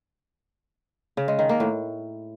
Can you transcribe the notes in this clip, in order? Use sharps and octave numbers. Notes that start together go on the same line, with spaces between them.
C#3
G#3
D#3
A#3
A2